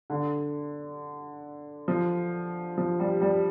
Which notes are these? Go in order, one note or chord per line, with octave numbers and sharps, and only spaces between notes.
D3
F3
F3
G3
G3